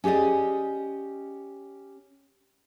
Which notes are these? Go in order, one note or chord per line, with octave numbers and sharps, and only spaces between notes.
C#4 G4 G#4 D5 D#5